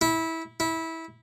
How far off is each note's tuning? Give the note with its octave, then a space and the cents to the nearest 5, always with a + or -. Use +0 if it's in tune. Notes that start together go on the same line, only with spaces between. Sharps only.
E4 -20
E4 -20